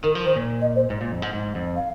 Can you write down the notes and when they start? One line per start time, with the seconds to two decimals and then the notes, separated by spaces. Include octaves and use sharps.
0.04 D#3 A#4
0.15 F3
0.25 D#3 C5
0.36 A#2
0.61 D#5
0.76 C5
0.90 G#2
1.01 A#2
1.12 F2
1.22 G#2
1.33 G#2
1.55 F2
1.76 F5